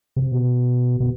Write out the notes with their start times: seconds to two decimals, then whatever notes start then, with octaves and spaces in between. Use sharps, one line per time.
0.16 C3
0.32 B2
1.00 B2